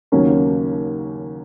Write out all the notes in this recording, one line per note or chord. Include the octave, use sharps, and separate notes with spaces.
D#2 C#3 F#3 A#3 C#4